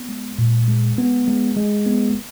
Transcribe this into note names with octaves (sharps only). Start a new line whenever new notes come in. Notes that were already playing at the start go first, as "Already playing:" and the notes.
Already playing: B3
G#3
A#2
G#3
B3
G#3
G#3
B3